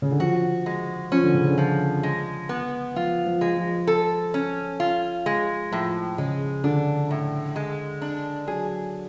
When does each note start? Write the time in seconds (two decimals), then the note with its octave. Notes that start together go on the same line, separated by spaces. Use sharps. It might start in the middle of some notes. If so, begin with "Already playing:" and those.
0.02 C#3
0.11 D3
0.19 F3 F#4
0.66 G#3
1.11 F3 C#4
1.23 D3
1.34 C#3
1.46 D3
1.58 F3
2.03 G#3
2.49 B3
2.96 F3 F4
3.26 F3
3.41 G#3
3.57 F3
3.87 A4
4.34 C#4
4.80 F4
5.26 G#3
5.72 A2 F3
6.18 C#3 G#3
6.64 D3 D4
7.11 A2
7.56 G#3
8.02 D4
8.48 F#3 G#4